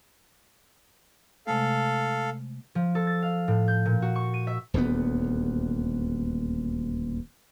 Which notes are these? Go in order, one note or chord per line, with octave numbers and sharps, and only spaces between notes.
C3 G#3 A3 A4 F5
F3
A4
A6
F5
A2
G6
A#2
F#4
C#6
D#7
E5
D#1 D2 G3 B3